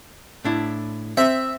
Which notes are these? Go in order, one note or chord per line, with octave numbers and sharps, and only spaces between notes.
A2 D4 E4
C4 E5